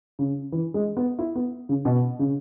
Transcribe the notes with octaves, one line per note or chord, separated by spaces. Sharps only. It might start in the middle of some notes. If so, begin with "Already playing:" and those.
C#3
E3
G#3
B3
E4
B3
C#3
B2
C#3